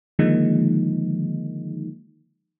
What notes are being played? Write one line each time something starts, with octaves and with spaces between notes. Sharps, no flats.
D3 D#3 F3 G#3 A#3 D#4